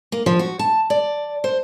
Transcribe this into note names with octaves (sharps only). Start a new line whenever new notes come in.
A#3
F3
F#4
A5
D5
C5